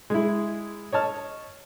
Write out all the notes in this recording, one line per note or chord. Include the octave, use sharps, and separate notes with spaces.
G#3 E4
C#5 D#5 A5 F6